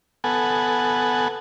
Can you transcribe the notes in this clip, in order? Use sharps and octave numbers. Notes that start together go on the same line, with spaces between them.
B3 A4 F#5 G#5